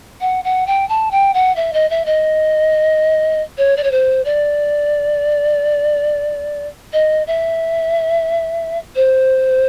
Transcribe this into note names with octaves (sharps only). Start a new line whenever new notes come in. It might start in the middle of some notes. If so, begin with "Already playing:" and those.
F#5
F#5
G5
A5
G5
F#5
E5
D#5
E5
D#5
C#5
D5
C#5
C5
D5
D#5
E5
C5